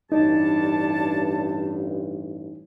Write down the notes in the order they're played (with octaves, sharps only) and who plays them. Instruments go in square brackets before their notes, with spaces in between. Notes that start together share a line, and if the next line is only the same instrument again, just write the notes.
[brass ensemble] A1 G2 [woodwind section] D4 C#5 A5 [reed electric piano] D#4